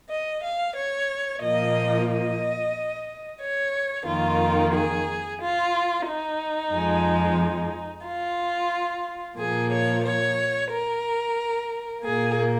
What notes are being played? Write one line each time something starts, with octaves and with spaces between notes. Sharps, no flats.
D#5
F5
C#5
A#2 F3 A#3 D#5
D#5
C#5
F2 D#3 A#3 F4
G#4
F4
D#4
F2 F3 G#3
F4
A#2 F3 A#3 G#4
C#5
C#5
A#4
A#2 A#3 G#4